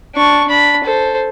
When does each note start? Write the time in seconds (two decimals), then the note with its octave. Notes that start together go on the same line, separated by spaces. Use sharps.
0.15 D4 C#6
0.48 D4 B5
0.84 A4 C5